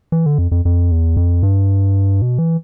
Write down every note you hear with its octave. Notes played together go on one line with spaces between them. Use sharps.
E3
D3
F2
F2
F2
E2
F2
G2
B2
E3